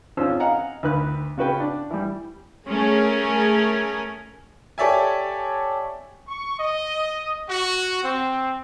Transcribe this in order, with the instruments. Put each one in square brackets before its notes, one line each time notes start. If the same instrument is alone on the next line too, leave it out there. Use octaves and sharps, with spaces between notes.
[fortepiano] G#1 C#4 D4 F4 C5 E6
D#5 F5 F#5 G#5 A#5
D2 D#3 B4 B5 F#6
C#3 F#4 B4 G5
D4
E3 G3
[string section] A3 C#4 G#4 A#4
[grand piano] G4 A4 C#5 D5 E5 G#5
[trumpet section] C#6
D#5
F#4
C4